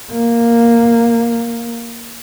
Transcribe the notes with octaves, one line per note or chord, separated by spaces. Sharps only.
A#3